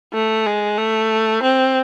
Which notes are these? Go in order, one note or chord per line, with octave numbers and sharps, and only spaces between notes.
A3
G#3
A3
C4